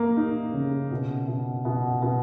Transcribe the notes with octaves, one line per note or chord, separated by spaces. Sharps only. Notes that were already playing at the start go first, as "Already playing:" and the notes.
Already playing: A#3
D#4
C#3
B2
B2
B2
B2